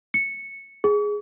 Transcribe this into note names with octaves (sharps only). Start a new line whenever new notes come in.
C#7
G#4